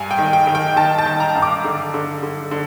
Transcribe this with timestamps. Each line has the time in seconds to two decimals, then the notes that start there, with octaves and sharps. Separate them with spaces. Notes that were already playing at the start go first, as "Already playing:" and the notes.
Already playing: G2 G#5
0.11 G5
0.18 D#3
0.33 G5
0.47 D#3
0.55 G5
0.76 D#3 A5
0.99 A5
1.06 D#3
1.20 A#5
1.35 G2
1.42 D6
1.65 D3
1.94 D3
2.23 D3
2.51 D3